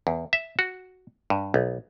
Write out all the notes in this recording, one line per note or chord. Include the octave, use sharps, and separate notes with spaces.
E2
E5
F#4
G2
B1